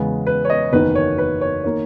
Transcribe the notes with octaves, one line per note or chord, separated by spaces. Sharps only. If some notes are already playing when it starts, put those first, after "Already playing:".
Already playing: E2 C#3 G#3 B3
B4
C#5
D#5
F#1 E2 D#3 B4
C#5
B4
C#5
D#3 A#3 C#5